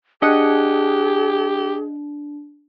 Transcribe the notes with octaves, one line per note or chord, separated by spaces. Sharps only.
D4 G4 G#4 D#5 F#5